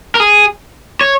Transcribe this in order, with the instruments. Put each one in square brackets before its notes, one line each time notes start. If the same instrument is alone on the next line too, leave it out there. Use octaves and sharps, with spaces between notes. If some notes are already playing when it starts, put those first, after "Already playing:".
[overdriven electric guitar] A#4
G#4
C#5